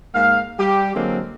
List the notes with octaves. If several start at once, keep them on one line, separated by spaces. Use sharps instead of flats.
G#2 A#3 F5
G3 G4
D3 F#3 G#3 A#3 C4